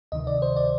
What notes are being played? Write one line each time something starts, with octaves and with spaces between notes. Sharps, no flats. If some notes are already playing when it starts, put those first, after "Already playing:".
D2 C3 D#3 D#5
D5
C5
D5